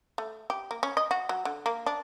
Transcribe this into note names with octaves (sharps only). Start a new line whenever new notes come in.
A3
G4
A#3
C#4
D#5
F#4
F#3
D3
A#3
D4